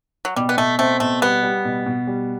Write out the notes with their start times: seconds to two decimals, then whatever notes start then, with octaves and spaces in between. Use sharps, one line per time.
0.25 F#3
0.36 B2 G3
0.49 B3
0.57 B2 A3
0.79 A3 C4
1.00 B2 A3
1.22 G3 B3
1.43 G3
1.65 B2
1.86 B2
2.07 G3